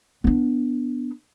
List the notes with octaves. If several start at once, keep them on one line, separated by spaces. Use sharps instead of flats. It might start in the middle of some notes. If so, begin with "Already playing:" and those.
B3 D4